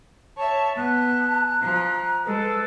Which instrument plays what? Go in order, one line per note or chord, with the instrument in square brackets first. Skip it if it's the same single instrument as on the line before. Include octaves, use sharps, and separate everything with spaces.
[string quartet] C#5 E5 [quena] A5
[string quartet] B3 [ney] A5 [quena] F#6
[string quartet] F3 [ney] A#5
[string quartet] G#3 [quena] A4 [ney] B4